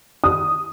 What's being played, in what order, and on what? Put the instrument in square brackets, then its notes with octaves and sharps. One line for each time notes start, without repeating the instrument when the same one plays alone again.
[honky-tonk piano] D#6